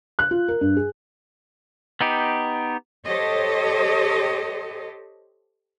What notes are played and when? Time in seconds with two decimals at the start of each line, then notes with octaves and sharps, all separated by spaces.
0.19 F#6
0.31 F4
0.48 A#4
0.61 G2
0.76 G#4
2.01 B3 D#4 G4
3.06 G4 A4 C5 C#5 D#5